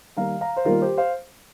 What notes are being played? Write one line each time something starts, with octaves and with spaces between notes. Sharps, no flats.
D#3 G3 A#3 F5 A#5
F5 A#5
C5
D#3 G3 A#3 F4 A#4
G4 C5
C5 F5